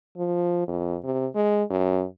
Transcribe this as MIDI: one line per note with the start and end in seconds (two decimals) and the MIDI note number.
0.18 0.65 53
0.68 0.97 41
1.04 1.27 48
1.35 1.64 56
1.70 2.05 42